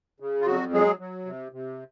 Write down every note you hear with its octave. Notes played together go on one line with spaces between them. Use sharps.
C#3
F4
F2 F#3 F#4
F#3 G#3 G#4
F#3
C3
C3